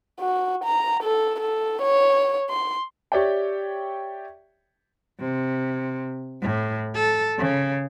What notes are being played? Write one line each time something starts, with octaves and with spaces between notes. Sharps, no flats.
F#4
A#5
A4
A4
C#5
C6
G4 C#5 D5 E5 G5
C3
A2
A4
C#3